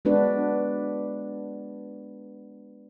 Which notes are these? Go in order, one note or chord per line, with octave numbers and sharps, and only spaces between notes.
G#3 B3 D4 F#4 B4 D5